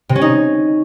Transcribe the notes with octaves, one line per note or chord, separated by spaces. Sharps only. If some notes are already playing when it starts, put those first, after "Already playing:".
C3
C#4
D#4